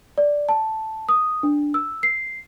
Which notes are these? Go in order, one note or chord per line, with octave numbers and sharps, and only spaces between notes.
D5
A5
D#6
D4
E6
C7